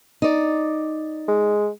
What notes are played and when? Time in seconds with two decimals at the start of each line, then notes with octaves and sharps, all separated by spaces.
0.22 D#4 D5
1.28 G#3